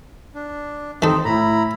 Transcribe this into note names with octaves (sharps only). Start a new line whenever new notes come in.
D4
D#3 C4 D#4 A4 A5
A2 E4 A#5 B5